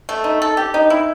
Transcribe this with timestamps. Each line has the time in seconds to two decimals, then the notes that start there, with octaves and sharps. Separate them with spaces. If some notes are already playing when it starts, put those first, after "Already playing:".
0.09 A3
0.24 D#4
0.42 A4
0.57 G4
0.74 D#4
0.90 E4